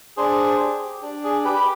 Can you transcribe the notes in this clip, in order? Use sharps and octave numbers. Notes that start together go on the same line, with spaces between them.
D4 G#4 C5
G4
D4
G#4
G4 B4